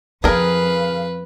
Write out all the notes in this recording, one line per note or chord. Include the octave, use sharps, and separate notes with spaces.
F2 C4 G#4 A#4 B4 F5